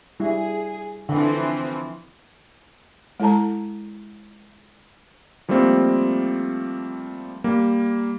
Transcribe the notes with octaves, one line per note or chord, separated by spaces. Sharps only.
G3 E4 G#4
D3 E3 F3 C4
G#3 E4 A4 A5 A#5
F3 G3 A3 A#3 C4
G3 A#3